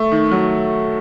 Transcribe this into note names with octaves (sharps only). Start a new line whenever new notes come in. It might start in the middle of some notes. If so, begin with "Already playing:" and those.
Already playing: A3
D#3
F#3